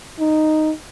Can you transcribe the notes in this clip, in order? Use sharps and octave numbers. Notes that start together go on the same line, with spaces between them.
D#4